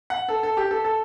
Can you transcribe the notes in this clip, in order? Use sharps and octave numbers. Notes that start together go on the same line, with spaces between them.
F#5
A4
A4
G4
A4
A4